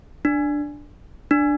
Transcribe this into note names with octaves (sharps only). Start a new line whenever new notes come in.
D4
D4